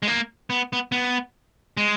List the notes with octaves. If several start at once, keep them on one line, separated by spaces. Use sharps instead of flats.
G#3
A#3
B3
B3
B3
G#3